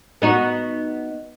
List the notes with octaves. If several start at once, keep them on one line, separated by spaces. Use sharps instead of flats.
B3 D#4 F#4